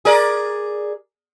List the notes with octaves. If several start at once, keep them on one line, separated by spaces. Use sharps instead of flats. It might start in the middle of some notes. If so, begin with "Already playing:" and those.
G#4 A#4 D5